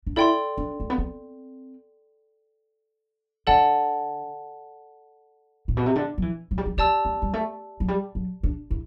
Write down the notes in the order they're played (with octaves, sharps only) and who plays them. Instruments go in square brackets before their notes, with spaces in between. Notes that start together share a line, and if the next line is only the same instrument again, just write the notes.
[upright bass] D4
[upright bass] E4 [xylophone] A4 D5 G5 C6
[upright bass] D4
A3
B3
C4
[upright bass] D3 [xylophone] A4 D5 F#5 A5
[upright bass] A2
B2
C3
D3
F#3
E3
F#3
G3
F#3
[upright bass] A3 [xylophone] G4 D5 A5 E6
[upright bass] A3
G3
A3
F#3
G3
F#3
D4
E4